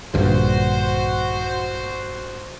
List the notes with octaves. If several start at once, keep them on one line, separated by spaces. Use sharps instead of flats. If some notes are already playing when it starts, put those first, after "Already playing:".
A#1 G2 D3 F#4 C5